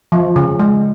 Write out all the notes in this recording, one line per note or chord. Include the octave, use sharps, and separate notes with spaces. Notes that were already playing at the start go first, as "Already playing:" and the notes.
F3
C#3
G#3